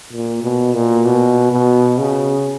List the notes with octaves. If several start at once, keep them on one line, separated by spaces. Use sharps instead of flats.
A#2
B2
A#2
B2
B2
C#3